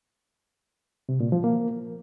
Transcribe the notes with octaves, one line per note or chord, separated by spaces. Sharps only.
C3
A#2
F3
A#3